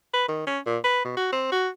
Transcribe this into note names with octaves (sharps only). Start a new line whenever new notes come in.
B4
D#3
C#4
A#2
B4
B2
F#4
C4
F#4